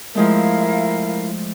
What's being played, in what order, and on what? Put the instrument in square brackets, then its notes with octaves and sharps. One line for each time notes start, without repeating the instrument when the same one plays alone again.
[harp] F3 G#3 A3 [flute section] E4 A#4 F5